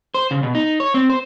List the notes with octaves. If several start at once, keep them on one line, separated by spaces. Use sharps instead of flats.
C5
C#3
B2
D#4
C#5
C4
C5